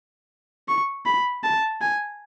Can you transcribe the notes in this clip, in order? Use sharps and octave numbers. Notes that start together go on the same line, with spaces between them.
C#6
B5
A5
G#5